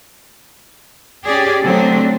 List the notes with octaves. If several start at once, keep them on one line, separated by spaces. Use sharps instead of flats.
C#4 G4 G#4 D5
D3 F#3 A3 C4 D4